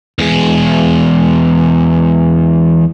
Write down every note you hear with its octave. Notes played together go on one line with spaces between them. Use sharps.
E2 G#3